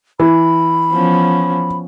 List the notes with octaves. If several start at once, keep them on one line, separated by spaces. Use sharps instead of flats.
E3 B5
F3 B3 C#4